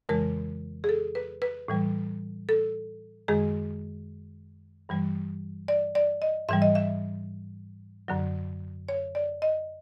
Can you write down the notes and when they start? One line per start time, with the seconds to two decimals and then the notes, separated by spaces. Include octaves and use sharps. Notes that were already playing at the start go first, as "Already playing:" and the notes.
0.09 F2 C#3 E3 G#3 A#4
0.84 G#4
0.89 A4
1.15 B4
1.42 B4
1.68 A2 E3 G3
2.49 A4
3.28 F#2 D#3 G#3 G#4
4.89 G2 E3 G3
5.68 D5
5.95 D5
6.22 D#5
6.49 G#2 E3 G3 E5
6.62 D#5
6.75 E5
8.08 F#2 D3 F#3
8.89 C#5
9.15 D5
9.42 D#5